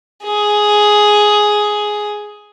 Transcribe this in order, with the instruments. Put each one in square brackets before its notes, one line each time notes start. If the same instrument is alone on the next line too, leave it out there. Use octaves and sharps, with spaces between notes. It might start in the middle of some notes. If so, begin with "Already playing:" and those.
[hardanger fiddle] G#4